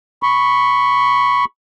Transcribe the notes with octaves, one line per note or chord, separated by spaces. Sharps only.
B5 C#6